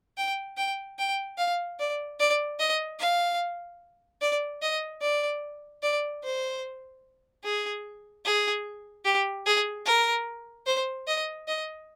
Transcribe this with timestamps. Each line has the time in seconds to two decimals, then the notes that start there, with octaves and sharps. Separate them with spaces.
0.18 G5
0.57 G5
0.99 G5
1.38 F5
1.80 D5
2.20 D5
2.60 D#5
3.00 F5
4.22 D5
4.62 D#5
5.01 D5
5.83 D5
6.24 C5
7.44 G#4
8.25 G#4
9.05 G4
9.46 G#4
9.86 A#4
10.66 C5
11.08 D#5
11.48 D#5